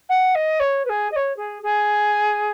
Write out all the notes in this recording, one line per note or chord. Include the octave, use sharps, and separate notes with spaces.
F#5
D#5
C#5
B4
G#4
D#5
C#5
G#4
G#4